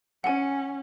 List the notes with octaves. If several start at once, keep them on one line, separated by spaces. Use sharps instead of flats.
C#4 F#5 G#5